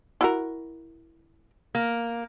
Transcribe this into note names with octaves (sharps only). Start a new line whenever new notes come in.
E4 F#4 A#4
A#3